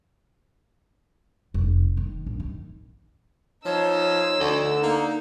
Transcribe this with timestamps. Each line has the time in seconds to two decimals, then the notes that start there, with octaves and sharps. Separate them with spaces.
1.54 F1
1.97 D#3
2.26 A#1
2.40 D#3
3.65 F3 D#4 C#5 E6
4.40 D2 D3
4.83 A#3 D#4